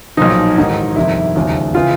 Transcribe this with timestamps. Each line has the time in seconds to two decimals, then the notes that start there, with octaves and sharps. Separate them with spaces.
0.17 B1 A#2 F3 D#4
0.57 A1 G#2 D#3
0.96 G1 F2 C3 D#3 E4
1.36 E1 D#2 C#3 F3
1.75 C#3 E3 F4